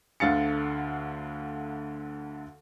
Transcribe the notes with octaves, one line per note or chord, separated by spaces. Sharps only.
D2 D3 F5 A6 C#7